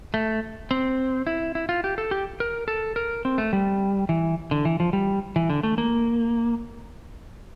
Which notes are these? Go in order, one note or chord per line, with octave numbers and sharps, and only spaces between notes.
A3
C4
E4
E4
F4
G4
A4
G4
A#4
A4
A#4
C4
A3
G3
E3
D3
E3
F3
G3
E3
D3
A3
A#3